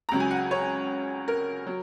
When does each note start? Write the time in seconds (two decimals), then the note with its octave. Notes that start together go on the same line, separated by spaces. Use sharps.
0.09 C#2 C#3 F#3 A#5
0.20 G#5
0.31 F#5
0.51 C#5
1.28 A#4
1.67 F#3